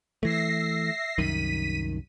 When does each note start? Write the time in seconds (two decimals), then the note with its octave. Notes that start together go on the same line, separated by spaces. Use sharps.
0.23 E3 A3 E5 A#6 C7
1.18 C2 F#2 D#3 B6 D#7